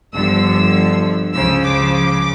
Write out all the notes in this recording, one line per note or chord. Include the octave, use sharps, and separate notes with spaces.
G1 G2 D3 F3 E6
C#2 C#3 F3 E6
D6